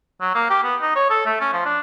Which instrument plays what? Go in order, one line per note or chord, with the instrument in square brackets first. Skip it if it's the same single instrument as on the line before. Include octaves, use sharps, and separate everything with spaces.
[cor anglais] F#3
A#3
G4
B3
D#4
C#5
A4
A3
C#4
F3
D4